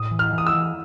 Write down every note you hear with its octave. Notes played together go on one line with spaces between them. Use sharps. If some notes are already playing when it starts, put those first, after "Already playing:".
Already playing: A2 D#6
E3
F6
E3
D#6
E6
E3